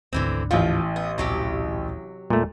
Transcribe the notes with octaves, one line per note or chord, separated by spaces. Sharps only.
G#1 D2 G#2 D3 E3 C4
A1 F3 F4 F5
B3
D1 A#1 C3 F#3 G4
D#1 G#1 A#2 G#3 A3